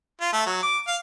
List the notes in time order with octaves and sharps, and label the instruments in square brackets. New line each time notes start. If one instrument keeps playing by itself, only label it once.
[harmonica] F4
A3
F#3
D6
F5